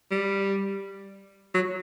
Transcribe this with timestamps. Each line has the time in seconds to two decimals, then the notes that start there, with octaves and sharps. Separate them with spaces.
0.11 G3
1.54 F#3